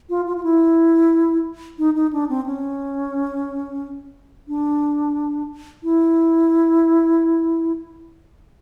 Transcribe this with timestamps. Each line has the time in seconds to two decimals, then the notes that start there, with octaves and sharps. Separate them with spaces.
0.09 F4
0.26 F4
0.36 F4
0.43 E4
1.78 D#4
1.95 D#4
2.13 D4
2.29 C4
2.46 C#4
4.48 D4
5.83 E4